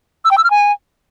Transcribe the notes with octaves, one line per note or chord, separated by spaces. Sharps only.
E6
G5
E6
F6
G#5